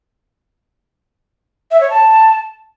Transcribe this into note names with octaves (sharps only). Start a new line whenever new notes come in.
E5
C#5
A5